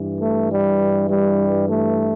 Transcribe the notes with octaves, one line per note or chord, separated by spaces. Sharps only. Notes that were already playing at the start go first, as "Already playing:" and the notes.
Already playing: G2 E3
A3
G3
G3
A3